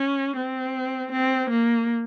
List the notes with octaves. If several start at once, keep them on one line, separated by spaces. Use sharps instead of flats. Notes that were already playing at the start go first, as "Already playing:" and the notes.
Already playing: C#4
C4
C4
A#3